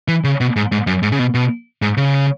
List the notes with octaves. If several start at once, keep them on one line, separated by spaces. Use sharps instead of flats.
E3
C#3
B2
G#2
G#2
F#2
G#2
C#3
B2
B2
G#2
C#3